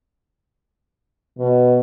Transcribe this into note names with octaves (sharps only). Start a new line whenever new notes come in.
B2